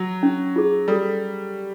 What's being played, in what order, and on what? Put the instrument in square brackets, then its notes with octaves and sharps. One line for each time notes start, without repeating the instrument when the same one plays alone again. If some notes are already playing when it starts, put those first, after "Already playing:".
Already playing: [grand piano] F#3
[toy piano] C#4
F4 G#4
[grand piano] G3 [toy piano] A4